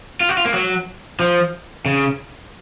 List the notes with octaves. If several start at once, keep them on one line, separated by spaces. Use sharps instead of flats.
F4
F#4
F4
A#3
F#3
F3
C#3